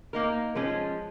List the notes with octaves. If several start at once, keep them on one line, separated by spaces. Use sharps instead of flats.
A#3 D#4 A#4
F3 G#3 C#4